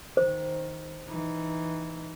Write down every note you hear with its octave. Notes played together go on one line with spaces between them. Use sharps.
D#3 C5
E3 D#4